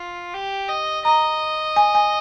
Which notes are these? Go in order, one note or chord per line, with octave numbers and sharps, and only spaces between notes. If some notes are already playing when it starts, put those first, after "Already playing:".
Already playing: F4
G4
D#5
D#5 A#5
G#5
G#5